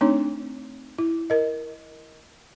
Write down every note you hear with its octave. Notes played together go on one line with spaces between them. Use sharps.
A3 C4 D4 D#4 C#5
E4
A#4 D#5